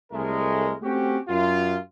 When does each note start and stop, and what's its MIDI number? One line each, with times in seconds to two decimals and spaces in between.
0.13 0.74 36
0.13 0.74 56
0.13 0.74 57
0.13 0.74 70
0.82 1.18 57
0.82 1.18 60
0.82 1.18 61
0.82 1.18 66
0.82 1.18 67
1.28 1.77 42
1.28 1.77 65